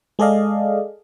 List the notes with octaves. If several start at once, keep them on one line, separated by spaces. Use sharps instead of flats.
G#3 G#4 A4 D5 D#5 F5